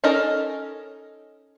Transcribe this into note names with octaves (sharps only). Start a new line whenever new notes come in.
C#4 D#4 A4 A#4 D#5